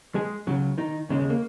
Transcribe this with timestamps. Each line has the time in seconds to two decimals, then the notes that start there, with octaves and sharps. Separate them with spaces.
0.15 G#3 G#4
0.47 C#2 C#3 F#3
0.78 D#3 D#4
1.09 D#2 C#3 G#3
1.20 G#3
1.30 A#3